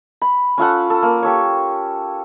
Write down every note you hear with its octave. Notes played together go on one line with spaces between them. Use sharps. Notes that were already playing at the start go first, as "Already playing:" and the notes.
B5
C#4 F4 A4 F#5
A4
A#3
G4 A4 C#5